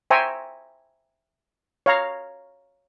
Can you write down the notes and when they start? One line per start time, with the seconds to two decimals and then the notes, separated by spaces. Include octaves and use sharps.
0.10 C5 E5 G5 G#5 A#5 C#6
1.86 C#5 F5 A#5